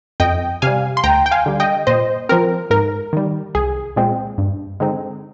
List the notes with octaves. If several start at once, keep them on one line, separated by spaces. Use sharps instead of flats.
F2 D#5 G5
C3 G3 F5 G#5
C6
D2 G5 A#5
G5
F5 G#5
D3 G3
D#5 G5
A#2 C5 D#5
F3 C4 A#4
G#2 A#4
D#3 G3
C2 G#4
A#2 G#3 C4
G2
D3 G#3 C4 D#4